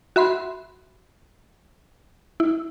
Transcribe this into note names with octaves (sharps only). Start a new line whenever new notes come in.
F#4 E5 B5 C6
E4